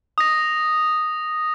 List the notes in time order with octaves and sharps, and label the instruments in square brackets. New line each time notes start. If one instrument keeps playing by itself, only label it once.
[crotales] D#6 A#6